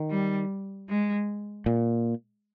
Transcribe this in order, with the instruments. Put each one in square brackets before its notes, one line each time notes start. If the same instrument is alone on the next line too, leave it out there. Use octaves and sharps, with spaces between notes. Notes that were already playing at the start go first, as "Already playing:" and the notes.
Already playing: [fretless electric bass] D#3
[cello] G3
G#3
[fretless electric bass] A#2